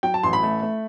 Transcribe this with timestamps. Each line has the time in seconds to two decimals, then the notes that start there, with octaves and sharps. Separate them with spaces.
0.03 F#3 G5
0.14 A5
0.23 A1 C6
0.33 B5
0.43 A3
0.62 A3